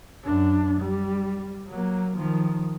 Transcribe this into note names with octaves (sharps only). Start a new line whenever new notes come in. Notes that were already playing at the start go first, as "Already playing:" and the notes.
F#2 D4
G3
F#3 A#3
D#3 F3